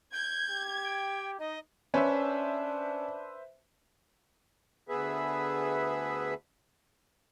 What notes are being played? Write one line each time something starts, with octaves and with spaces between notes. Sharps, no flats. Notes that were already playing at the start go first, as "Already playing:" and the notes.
G6 G#6
G4
G5
D#4 D#5
C#4 D4 B4 C5 E5
D2 B3 G#4 B4 E5